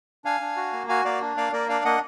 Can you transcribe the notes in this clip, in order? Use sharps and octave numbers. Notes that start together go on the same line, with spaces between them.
D4 F5 G#5
D4
F#4
A#3
F#4 F5 G#5
A#3 D5 F5
D4
A#3 D5 F5
A#3 A#4 D5
D4 D5 F5
A#3 D#5 F#5